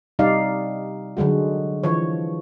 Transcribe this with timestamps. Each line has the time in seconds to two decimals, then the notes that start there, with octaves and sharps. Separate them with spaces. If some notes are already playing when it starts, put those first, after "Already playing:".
0.19 C3 G3 D#4 D5 F5
1.17 D3 F#3 G#3 F#4
1.84 E3 F3 C#5